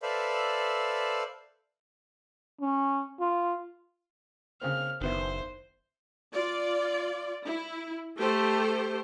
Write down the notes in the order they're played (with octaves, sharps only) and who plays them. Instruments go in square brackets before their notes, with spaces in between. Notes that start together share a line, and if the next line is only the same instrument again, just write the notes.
[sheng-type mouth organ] A4 B4 C5 D5 E5 F5
[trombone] C#4
F4
[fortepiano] C#3 A#3 C4 [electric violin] F6
[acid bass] F#1 [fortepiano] D#3 B3 E4 [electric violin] C5
[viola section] F4 D5
E4
[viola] A3 [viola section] G4 A4 C5